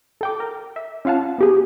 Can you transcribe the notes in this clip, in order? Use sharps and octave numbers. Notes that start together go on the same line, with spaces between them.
A4 G5 D6
A#4
E5
C#4 F4 F5 F#5 A5
B3 G4 G#4